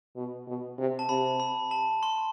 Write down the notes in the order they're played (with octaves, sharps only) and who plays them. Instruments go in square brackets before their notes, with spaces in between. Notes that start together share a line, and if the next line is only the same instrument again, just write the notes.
[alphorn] B2
B2
C3
[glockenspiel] A5
[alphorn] C3 [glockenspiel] B5
[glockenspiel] B5
A5
C6